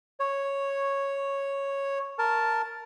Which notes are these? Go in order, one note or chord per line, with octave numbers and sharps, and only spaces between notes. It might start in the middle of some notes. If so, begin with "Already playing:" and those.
C#5
A#4 A5